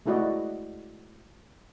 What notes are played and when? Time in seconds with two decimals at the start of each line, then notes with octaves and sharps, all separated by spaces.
0.06 G#3 A3 E4 F#4 D5 D#5